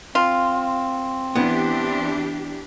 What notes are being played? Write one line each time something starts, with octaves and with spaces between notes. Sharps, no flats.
C4 F4
E3 B3 D4 E4 G4